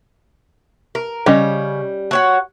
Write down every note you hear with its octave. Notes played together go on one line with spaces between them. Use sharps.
A#4
C#3 G3 C#4 D#5
F#4 C#5 F#5